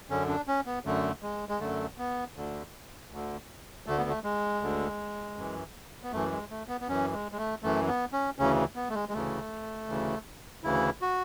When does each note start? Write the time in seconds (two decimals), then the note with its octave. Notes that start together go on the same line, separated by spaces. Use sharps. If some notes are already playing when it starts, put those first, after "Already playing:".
0.10 F#2 D3 C#4
0.28 D4
0.47 C#4
0.66 B3
0.85 F#2 D3 A3
1.22 G#3
1.49 G#3
1.60 F#2 D3 A3
1.98 B3
2.36 D2 D3
3.11 D2 D3
3.86 D2 D3 A3
3.98 B3
4.09 A3
4.24 G#3
4.62 D2 D3
5.36 F#2 E3
6.03 B3
6.12 F#2 E3 A3
6.32 G#3
6.50 A3
6.68 B3
6.81 B3
6.88 F#2 E3 C#4
7.12 G#3
7.32 G#3
7.38 A3
7.63 F#2 E3 A3
7.88 B3
8.13 C#4
8.39 D2 C#3 E3 C#4
8.76 B3
8.89 A3
8.95 G#3
9.09 G#3
9.13 D2 C#3 E3 A3
9.88 D2 C#3 E3
10.64 D2 C#3 E3 E4
11.02 F#4